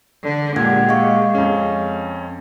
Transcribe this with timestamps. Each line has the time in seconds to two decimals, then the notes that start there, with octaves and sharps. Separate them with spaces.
0.23 D3
0.56 A#2 G#3 G4 F#5 G#6
0.89 D#5 F5 C#6
1.35 F2 C#4